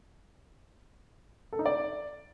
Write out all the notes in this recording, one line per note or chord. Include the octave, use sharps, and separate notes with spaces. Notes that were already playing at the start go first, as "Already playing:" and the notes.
A4
D#4
D5